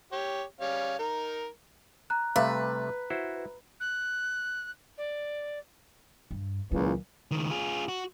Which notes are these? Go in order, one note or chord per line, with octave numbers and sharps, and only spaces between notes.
G4 C#5
G3 C#4 F5
D#4 A#4
A#5 F#6
C3 G3 A3 B4 E5 F5
E4 F#4 C5
F#6
D5
G2
C#2 A#2 D#3 E3 F#3
C#2 D#3
F4 G#4
F#4